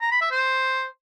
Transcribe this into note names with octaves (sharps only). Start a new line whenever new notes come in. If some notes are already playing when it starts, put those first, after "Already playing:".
A#5
B5
E5
C5